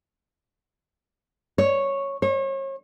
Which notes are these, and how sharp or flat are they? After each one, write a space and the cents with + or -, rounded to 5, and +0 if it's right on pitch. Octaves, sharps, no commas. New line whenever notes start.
C#5 -5
C#5 -40